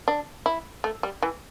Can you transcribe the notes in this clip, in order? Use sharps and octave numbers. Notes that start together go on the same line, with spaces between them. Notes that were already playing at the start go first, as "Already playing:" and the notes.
D4
E4
A3
G3
E3